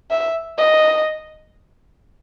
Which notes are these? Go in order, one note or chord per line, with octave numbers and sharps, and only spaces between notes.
E5
D#5